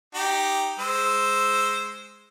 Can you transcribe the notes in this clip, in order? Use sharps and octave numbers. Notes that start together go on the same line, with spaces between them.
D#4 G4
G#3 C5 E6